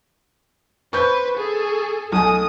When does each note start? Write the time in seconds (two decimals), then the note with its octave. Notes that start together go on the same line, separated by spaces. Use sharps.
0.93 B4 C5 C#6 G6
1.37 G#4 A4
2.13 B1 A3 G#5 D#6